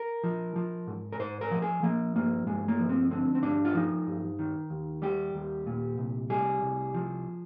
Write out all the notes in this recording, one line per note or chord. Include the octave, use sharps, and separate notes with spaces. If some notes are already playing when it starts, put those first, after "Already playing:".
Already playing: A#4
F3
F3
G#2
A#4
G#2 C5
A#4
F3
G#4
F3 A#3
G2 A#3
G2 G#3
A#3
F3
C4
D3 C4
C4
G2 D4
F4
F3 D#4
G2
D#3
D#2
G3 G4
D#2
A#2
C2
G3 G#4
C2
F3